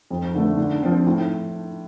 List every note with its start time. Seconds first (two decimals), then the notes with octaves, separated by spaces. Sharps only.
0.10 F2
0.35 D3 A3
0.57 D3
0.82 F3 C4
1.06 A2